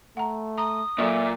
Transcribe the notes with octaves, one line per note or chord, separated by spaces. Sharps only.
A3 F#5 A#5
A#5 D#6
A#2 F#3 A4 E5 C#6